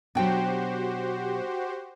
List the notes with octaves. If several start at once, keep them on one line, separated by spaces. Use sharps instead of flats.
B2 F#3 D4 F#4 G4 C5 G5